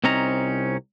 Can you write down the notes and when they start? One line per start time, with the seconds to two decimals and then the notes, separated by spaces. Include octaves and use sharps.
0.04 C2 C4 C#4 D#4 A#5